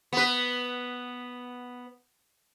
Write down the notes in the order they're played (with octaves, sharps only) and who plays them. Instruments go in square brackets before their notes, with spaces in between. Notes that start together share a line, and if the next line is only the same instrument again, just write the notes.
[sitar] B3 B4